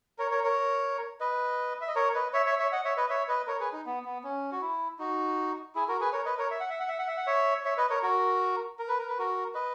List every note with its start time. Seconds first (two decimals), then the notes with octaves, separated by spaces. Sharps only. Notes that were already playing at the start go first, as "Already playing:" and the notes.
0.18 A#4 C#5
0.31 A#4 C#5
0.44 A#4 C#5
1.20 B4 D#5
1.81 E5
1.88 D#5
1.95 A#4 C#5
2.14 B4 D#5
2.33 C#5 E5
2.46 C#5 E5
2.59 C#5 E5
2.72 D#5 F#5
2.85 C#5 E5
2.97 B4 D#5
3.09 C#5 E5
3.28 B4 D#5
3.47 A#4 C#5
3.60 G#4 B4
3.73 D#4
3.86 B3
4.05 B3
4.24 C#4
4.52 F#4
4.61 E4
4.99 D#4 F#4
5.75 E4 G#4
5.88 F#4 A#4
6.00 G#4 B4
6.13 A#4 C#5
6.26 B4 D#5
6.38 A#4 C#5
6.51 E5
6.60 F#5
6.70 E5
6.80 F#5
6.88 E5
6.99 F#5
7.08 E5
7.17 F#5
7.27 C#5 E5
7.65 C#5 E5
7.77 B4 D#5
7.90 A#4 C#5
8.03 F#4 A#4
8.79 A#4
8.88 B4
8.99 A#4
9.08 B4
9.19 F#4 A#4
9.54 B4 D#5